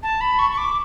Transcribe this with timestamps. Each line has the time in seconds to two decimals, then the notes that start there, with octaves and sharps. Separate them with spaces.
0.03 A5
0.21 B5
0.39 C#6
0.51 C#6
0.57 D6